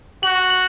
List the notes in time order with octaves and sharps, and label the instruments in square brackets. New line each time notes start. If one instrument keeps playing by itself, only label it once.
[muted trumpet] F#4 [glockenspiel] F#7
[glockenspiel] F#7